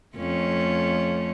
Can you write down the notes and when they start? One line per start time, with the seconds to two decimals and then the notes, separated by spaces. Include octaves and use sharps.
0.16 F2 A3 C#4